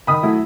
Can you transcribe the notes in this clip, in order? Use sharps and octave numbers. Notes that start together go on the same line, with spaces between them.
D#3 B5 D#6
F#3 A3 E4